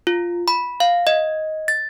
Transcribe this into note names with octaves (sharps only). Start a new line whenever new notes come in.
F4
B5
F5
D#5
A6